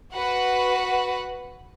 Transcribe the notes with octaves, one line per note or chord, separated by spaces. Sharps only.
F#4 B4 F#5